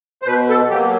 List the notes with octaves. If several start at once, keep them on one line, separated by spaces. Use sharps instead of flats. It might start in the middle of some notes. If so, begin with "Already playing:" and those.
C5
B2 B4
A4
F#3 A#3 G4